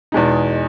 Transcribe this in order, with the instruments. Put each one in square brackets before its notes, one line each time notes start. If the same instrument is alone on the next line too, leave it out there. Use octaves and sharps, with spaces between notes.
[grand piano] E2 B2 G#3 D#4